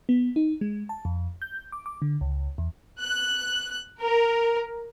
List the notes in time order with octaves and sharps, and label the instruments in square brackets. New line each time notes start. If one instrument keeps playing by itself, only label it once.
[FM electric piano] B3
D#4
G#3
A5
F2
G6
D6
D6
D3
C#2
E2
[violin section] F#6
A#4